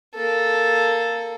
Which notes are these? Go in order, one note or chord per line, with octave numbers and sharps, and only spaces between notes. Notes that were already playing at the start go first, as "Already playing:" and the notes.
A#3 A4